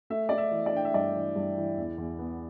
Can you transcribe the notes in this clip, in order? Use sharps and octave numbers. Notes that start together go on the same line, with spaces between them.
A3 E5
A3 D5
E5
E3
D5
D4 G5
E5
G2 D5
E3
G2
E3
E2
E2
B3